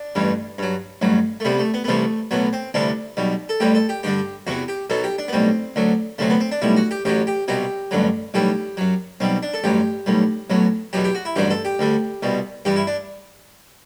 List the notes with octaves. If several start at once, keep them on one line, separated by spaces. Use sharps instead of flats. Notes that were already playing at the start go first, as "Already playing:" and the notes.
Already playing: D4
A1 G2 E3 G3
G2 F#3
A1 G2 F#3
A3
C2 C3 G3 B3
A3
B3
B3
C2 C3 E3 G3 A3
B1 A2 F#3 B3
C4
D2 C3 E3 G3 D4
B1 B2 G3
A4
A1 A2 E3 G3 G4
A4
G4
G2 D3 G3 G4
E2 C3 E3 F#4
G4
B1 B2 F#3 A4
G4
D4
B3
B1 A2 G3 C4
D2 D3 F#3
D2 C3 F#3 A3
B3
C4
D4
B1 A2 G3 E4
F#4
G4
A1 A2 F#3 G4
G4
C2 B2 F#3 G4
A1 G2 D3 F#3
B1 A2 E3 G3 G4
F#2 F#3
B1 B2 G3 C4
D4
A4
A1 G2 F#3 G4
B1 A2 G3
B1 A2 F#3
E2 B2 F#3 G4
G4
F#4
E4
A1 G2 D3 F#3 G4
A4
G4
D2 D3 G3
C2 B2 G3
G2 E3 G3 G4
E4
D4